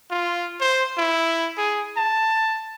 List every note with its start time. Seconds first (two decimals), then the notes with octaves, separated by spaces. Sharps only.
0.11 F4
0.60 C5
0.98 E4
1.58 G#4
1.97 A5